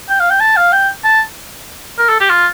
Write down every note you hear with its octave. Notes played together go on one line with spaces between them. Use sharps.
G5
F5
G5
A5
F5
G5
A5
A#4
A4
G4
F4